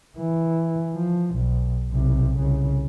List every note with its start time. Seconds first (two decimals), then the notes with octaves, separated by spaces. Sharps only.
0.18 E3
0.94 F3
1.35 B1
1.91 B1 C3
2.38 C2 C#3